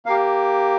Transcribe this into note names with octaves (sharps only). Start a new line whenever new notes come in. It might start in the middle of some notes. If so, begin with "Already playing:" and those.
A#3 G4 F5